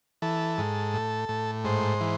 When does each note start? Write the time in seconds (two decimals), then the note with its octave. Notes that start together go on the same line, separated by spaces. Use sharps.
0.22 E3 A4
0.58 G#2
0.94 A2
1.29 A2
1.65 G#2 C5
2.01 E3